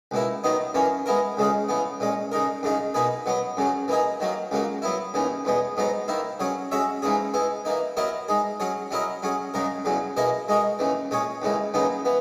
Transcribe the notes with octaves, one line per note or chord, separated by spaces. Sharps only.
C#2 B2 A#3 E4
D#3 F#3 B3 D#4
F#2 E3 A#3 C#4
G#3 B3 E4 A#4
C#2 C#3 G#3 C#4 G#4
C#3 E3 B3
A#2 G#3 C#4
C#3 G#3 D#4 A#4
F#2 C#3 G#3 D#4
B2 A#3 D#4 G#4 B4
B2 F#3 B3
F#2 C#3 F#3
E3 A#3 D#4 G#4
D#3 F#3 A#3
C#2 C#3 F#3 A#3
F#3 B3 E4
D#2 C#3 E3 B3
E2 B2 G#3 B3
G#2 F#3 B3 D#4
D#3 A#3 E4
F#3 C#4 G#4
G#3 C#4 F#4 C#5 E5
G#2 E3 A#3 C#4 G#4
G#3 B3 E4
E3 A#3 D#4
F#3 B3 E4 A#4 D#5
G#3 D#4 G#4
F#3 C#4 G#4 C#5
F#3 C#4 E4 A#4 D#5
F#3 C#4 G#4
F#2 C#3 G#3 D#4 A#4
E2 C#3 F#3
B2 A#3 E4 G#4 D#5
G#3 D#4 F#4 A#4
D#2 C#3 E3
A#2 G#3 C#4 G#4 C#5
D#2 C#3 E3 G#3
D#2 C#3 F#3 B3 D#4
E3 B3